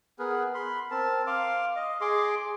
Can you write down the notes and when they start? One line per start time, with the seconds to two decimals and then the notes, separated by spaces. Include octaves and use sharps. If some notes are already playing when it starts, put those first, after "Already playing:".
0.19 B3 G#4 A#4 B4
0.54 B5 C6
0.91 C4 A#4 A5
1.27 F5 C6 D6
1.76 D#5
2.01 G#4 C6 D6